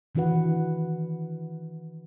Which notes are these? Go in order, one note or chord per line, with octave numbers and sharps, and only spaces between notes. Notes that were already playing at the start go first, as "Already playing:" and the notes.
D#3 E3 D4 F#4 B4 F#5